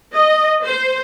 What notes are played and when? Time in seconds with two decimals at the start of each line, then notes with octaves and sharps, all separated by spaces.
0.15 D#5
0.64 C5